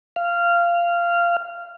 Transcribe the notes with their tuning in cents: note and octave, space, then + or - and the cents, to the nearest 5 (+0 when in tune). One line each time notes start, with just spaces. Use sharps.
F5 -15